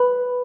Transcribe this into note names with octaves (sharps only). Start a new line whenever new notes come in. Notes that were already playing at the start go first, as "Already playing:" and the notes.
Already playing: B4